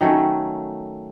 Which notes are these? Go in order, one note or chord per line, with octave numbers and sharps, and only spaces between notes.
D#3 F#3 A3 C#4